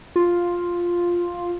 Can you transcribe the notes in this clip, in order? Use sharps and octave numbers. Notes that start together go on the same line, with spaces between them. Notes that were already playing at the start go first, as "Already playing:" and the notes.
F4